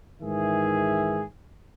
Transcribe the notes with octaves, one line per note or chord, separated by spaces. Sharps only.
G#2 D#3 E3 G#4 E5